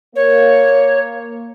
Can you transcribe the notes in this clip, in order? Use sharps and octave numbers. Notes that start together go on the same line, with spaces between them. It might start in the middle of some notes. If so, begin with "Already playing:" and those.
A#3 C#5